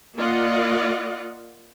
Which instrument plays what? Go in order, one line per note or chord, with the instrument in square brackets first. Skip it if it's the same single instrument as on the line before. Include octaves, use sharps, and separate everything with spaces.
[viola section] A#3 F4 D5 D#5 F5 F#5